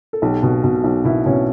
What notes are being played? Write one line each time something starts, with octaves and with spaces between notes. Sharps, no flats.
A4
B1 G4
B2
B2
B1
B2 E4
B2 C#4